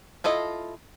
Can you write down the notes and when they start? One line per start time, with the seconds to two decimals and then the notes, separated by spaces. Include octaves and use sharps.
0.24 E4 F4 A4 D#5